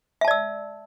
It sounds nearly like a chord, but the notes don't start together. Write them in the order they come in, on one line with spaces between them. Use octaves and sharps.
E5 A5 D5 E6